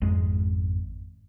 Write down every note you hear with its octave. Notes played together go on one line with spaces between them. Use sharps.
G#1 F2 G#3